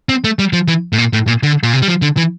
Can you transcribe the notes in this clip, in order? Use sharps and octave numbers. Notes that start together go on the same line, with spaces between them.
C4
A3
G3
F3
E3
A2
A#2
A2
A#2
D3
A#2
C3
G3
F3
D3
E3